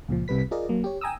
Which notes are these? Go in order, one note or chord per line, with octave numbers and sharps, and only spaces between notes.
C#2 A#2 F3
C2 C3 G3 B4 B6
F4 G#4 A#4 D5 D#5
F#3 A#3
G4 C#5
G5 G#5 A#5 D#6 E6